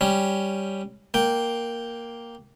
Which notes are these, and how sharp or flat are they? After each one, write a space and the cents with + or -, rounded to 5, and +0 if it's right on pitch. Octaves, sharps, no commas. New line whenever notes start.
G3 +0 C#4 +0
A#3 +0 G5 +0